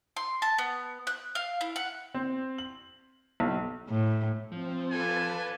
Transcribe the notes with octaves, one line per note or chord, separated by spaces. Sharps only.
C6
A5
B3
F#6
F5
E4
F#5
C4
F#7
B1
A2
F3 C4
F4 A4 B4 D5 G#5 A5